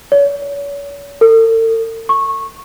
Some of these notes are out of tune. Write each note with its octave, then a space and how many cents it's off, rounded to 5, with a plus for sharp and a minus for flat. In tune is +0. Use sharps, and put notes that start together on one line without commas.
C#5 +40
A4 +45
C#6 -15